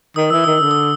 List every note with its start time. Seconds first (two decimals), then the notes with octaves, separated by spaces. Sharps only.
0.16 D#3 D#6
0.30 E3 E6
0.44 D#3 D#6
0.58 D3 E6
0.71 D#6